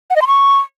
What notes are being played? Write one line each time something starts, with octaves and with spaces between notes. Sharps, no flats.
F#5
D#5
C6
C#6